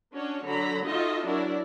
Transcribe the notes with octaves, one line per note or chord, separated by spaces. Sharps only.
C#4 D4 F#4 C#5
D3 F#3 A#5 B5
D#4 F4 F#4 A4 D#5 E5
F#3 D4 E4 F#4 A#4 D5